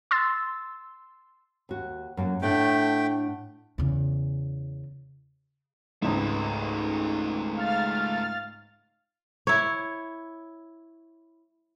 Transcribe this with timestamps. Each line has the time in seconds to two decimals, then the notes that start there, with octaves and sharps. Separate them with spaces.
0.11 C6 E6 A6
1.69 D#2 F#4
2.17 F#2 A#3 F#4
2.42 A2 A3 D4 F#5 G5
3.78 E2 C#3
6.02 G#1 C#2 G#2 A3 B4
7.57 F5 F6 A6
9.47 E4 C#5